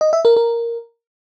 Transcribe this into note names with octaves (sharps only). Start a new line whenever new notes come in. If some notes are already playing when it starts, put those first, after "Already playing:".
D#5
E5
A#4
A#4